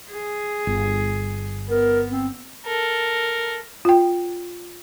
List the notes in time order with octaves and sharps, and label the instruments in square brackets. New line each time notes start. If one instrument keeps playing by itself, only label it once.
[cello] G#4
[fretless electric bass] G1
[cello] B3 [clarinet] A#4
[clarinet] C4
[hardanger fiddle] A4 A#4
[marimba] F4 G5